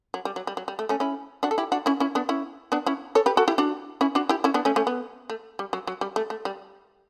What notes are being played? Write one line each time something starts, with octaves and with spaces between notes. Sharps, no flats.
F#3
G3
F#3
G3
F#3
G3
A3
A3 C#4
C#4 E4
D4 F#4
A4
E4 G4
D4 F#4
C#4 E4
C#4 E4
B3 D4
C#4 E4
B3 D4
C#4 E4
A4 C#5
G4 B4
F#4 A4
E4 G4
D4 F#4
C#4 E4
D4 F#4
E4 G4
C#4 E4
B3 D4
A3 C#4
A3 C#4
B3
A3
G3
F#3
F#3
G3
A3
A3
G3